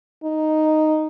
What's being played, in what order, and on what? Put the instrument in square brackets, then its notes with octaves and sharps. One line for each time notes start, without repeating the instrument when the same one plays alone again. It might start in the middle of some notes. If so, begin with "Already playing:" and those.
[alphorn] D#4